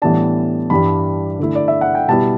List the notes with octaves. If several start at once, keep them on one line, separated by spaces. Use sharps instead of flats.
A2 E3 G3 B3 D4 A5
G2 E3 G3 D4 B5
D3 A3 E4
D5
E5
F#5
G5
B2 G3 B3 E4 A5